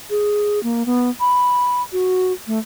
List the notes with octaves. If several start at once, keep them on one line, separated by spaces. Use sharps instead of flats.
G#4
A#3
B3
B5
F#4
A3